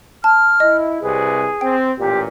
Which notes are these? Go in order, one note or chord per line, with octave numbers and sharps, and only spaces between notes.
A5 F6
E4 D#5
C2 C3 G#4 B4
C4 G5
A1 A#2 G4